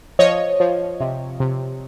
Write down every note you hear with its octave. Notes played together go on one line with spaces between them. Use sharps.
F3 C#5 D#5
F3
C3
C3